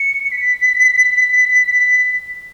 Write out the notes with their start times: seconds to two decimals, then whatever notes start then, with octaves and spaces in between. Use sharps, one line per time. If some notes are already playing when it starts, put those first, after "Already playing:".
Already playing: C#7
0.31 B6
1.65 B6